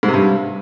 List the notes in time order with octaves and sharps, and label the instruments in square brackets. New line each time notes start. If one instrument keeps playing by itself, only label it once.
[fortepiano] G#2
C3
G2